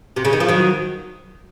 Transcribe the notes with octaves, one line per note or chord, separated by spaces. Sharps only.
C3
C#3
D#3
F3
D#3 F#3